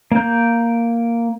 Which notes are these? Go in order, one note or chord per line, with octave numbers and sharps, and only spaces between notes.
A#3 G6